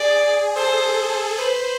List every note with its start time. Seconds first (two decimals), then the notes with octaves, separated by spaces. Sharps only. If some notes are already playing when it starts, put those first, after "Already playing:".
Already playing: G#4 D5
0.56 A4 C5
1.38 B4 C5